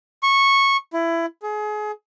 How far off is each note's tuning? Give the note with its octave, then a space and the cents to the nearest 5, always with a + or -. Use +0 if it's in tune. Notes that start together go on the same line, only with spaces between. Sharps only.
C#6 -10
E4 +20
G#4 +30